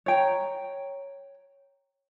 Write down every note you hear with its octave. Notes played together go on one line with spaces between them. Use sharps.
C#5 G5 A#5